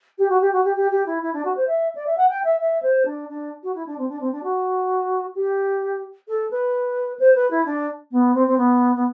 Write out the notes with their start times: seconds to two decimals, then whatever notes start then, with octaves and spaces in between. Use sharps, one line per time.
0.19 G4
0.30 F#4
0.41 G4
0.53 F#4
0.65 G4
0.76 G4
0.91 G4
1.06 E4
1.22 E4
1.34 D4
1.45 F#4
1.57 C5
1.67 E5
1.95 D5
2.07 E5
2.17 F#5
2.29 G5
2.44 E5
2.60 E5
2.83 C5
3.06 D4
3.29 D4
3.63 F#4
3.75 E4
3.87 D4
3.98 C4
4.09 D4
4.20 C4
4.32 D4
4.43 F#4
5.35 G4
6.28 A4
6.51 B4
7.20 C5
7.35 B4
7.51 E4
7.66 D4
8.11 B3
8.34 C4
8.47 C4
8.58 B3
8.96 B3